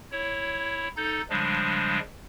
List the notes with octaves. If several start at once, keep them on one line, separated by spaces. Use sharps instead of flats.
E4 C#5
D#4 A4 G6 A6
C#3 F3 G3 G#3 D4